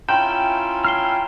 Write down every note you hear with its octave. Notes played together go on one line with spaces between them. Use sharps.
C#4 E4 F4 G5 A#5 C6 E7
G5 A#5 F6 C7 G7